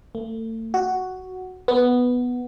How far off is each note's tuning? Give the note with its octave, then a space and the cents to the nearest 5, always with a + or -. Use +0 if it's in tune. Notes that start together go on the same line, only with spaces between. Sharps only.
A3 +35
F#4 +5
B3 +0